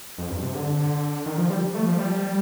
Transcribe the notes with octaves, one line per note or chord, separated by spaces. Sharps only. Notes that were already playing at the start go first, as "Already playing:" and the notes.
F2
G2
C3
D3
D#3
F3
G3
A3
F3
G3